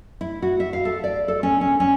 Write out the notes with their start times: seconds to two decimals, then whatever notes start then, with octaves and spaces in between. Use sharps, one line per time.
0.21 E4
0.42 F#4
0.60 E5
0.73 F5
0.85 A4
1.04 D5
1.28 A4
1.43 C#4
1.61 C#4
1.80 C#4